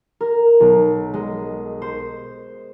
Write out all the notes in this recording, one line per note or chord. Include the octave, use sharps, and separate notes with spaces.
A#4
B1
G#3
C5